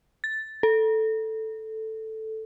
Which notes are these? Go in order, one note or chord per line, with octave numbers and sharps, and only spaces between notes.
A6
A4